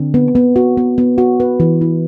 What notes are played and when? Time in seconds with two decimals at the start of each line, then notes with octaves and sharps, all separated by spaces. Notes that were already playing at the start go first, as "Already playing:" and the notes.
Already playing: D3 C4
0.14 B3
0.35 B3
0.56 F#4
0.77 B3
0.98 B3
1.18 F#4
1.40 B4
1.60 E3
1.81 E4